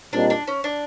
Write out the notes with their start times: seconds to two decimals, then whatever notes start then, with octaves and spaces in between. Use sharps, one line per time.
0.13 A#2 G3 C4 D4 D#4
0.30 D4
0.47 C#4
0.64 D4